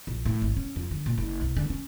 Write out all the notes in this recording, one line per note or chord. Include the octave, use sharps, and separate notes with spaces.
A#1
A2
G#1
C#4
F2
D3
A#2
F#1
C2
D3
C#4